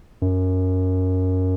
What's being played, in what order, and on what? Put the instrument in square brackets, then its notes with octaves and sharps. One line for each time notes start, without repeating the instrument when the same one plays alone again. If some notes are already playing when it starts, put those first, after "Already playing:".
[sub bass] F#2